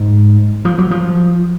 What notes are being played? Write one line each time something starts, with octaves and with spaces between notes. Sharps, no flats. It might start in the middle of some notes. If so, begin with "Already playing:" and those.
Already playing: G#2
F3
F#3
F3